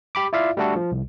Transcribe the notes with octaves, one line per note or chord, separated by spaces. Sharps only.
G4 B5 D6
E4 F4 D5 E5 F5
G3 A3 D4 F#4 A4
F3
C2